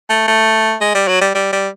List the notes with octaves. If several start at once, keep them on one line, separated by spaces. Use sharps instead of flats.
A3
A3
G#3
G3
F#3
G3
G3
G3